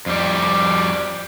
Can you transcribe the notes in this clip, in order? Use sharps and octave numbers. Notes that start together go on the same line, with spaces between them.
F2 G3